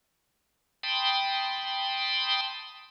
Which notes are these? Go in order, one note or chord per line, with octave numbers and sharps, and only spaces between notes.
G5 A5 B5 C6 D#6